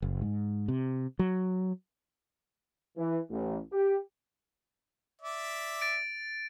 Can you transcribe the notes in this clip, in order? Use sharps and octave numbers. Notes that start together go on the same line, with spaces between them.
F#1
G#2
C3
F#3
E3
A1
G4
D5 E5
A6 D7